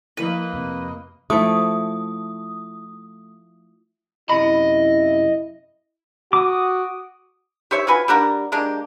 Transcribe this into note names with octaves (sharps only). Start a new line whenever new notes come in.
F3 A#3 E4 B4 D#5
F2 C3
F3 A3 E4 D#6
F#2 C3 E4 D#5 B5
F#4 D6 D#6
G4 C5 C#5 E5
F4 F#4 B4 G#5
G3 D4 A#4 F#5
G#3 A#3 D4 G4